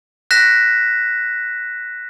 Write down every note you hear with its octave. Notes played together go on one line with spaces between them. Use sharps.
F#6 A#6 B6 E7